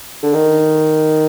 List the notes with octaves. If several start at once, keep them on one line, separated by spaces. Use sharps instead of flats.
D3
D#3